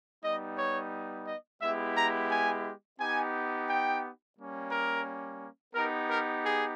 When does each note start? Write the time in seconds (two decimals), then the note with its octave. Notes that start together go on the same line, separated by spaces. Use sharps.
0.23 G3 B3 D#4 D#5
0.58 C#5
1.27 D#5
1.62 G#3 B3 E4 G4 E5
1.97 A#5
2.30 G#5
3.00 B3 D#4 G4 G#5
3.69 G5
4.37 G3 A#3 C#4
4.72 A#4
5.75 B3 D#4 G4 A#4
6.10 A#4
6.45 G#4